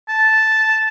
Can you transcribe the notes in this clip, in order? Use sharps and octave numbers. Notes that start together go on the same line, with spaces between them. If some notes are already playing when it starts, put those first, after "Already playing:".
A5